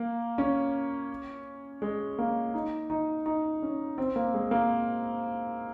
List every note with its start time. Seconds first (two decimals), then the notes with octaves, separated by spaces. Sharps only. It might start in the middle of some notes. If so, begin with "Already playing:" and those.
Already playing: A#3
0.38 C#4
1.82 G#3
2.19 A#3
2.54 D#4
2.90 D#4
3.26 D#4
3.62 C#4
3.98 C4
4.16 A#3
4.34 G#3
4.51 A#3